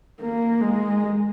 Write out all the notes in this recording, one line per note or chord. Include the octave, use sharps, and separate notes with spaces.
A#3
G#3